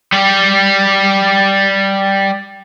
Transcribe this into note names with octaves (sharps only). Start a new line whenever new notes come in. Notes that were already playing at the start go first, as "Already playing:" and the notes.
G3 G4